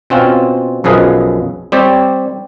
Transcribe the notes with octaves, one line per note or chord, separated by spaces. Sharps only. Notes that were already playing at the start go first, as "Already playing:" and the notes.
B2 C4 C#4 F4
B1 F#2 F3 G#4 B4 D#5
G3 C4 G4 C#5 D5